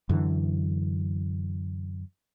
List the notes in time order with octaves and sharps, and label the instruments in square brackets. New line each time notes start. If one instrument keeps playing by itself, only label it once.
[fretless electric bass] F#2 D3 E3